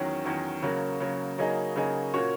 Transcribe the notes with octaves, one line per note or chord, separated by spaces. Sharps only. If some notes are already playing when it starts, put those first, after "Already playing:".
Already playing: E2 D#3 F#3 C#4
E2 D#3 F#3 C#4
C#3 F#3 A#3
C#3 F#3 A#3
C#3 F#3 A#3 D#4 G#4
C#3 F#3 A#3 D#4 G#4
A#2 A#3 C#4 F#4 C#5